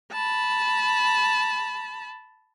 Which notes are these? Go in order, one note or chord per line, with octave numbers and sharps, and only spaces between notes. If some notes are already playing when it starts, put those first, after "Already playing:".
A5 B5